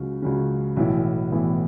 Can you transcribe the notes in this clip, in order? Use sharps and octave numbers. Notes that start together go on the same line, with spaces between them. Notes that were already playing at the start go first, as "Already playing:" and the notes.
Already playing: C#2 C#3 F#3 C#4
C#2 C#3 F#3 C#4
B1 A2 E3 B3 E4
B1 A2 E3 B3 E4